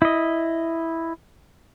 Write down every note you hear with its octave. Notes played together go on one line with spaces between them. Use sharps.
E4 D#5